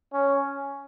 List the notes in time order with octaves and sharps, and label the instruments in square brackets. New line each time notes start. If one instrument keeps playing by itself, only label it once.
[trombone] C#4